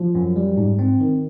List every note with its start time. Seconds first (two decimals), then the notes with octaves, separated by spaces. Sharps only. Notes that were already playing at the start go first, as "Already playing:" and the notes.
Already playing: F3
0.15 F#2
0.36 G3
0.57 G#2
0.79 C4
1.00 D#3